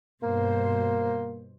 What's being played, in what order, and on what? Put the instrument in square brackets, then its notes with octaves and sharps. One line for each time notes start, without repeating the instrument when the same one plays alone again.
[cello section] G2 B2 C5 [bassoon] A#3